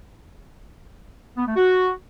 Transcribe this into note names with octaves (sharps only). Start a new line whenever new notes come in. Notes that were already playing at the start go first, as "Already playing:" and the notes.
B3
A3
F#4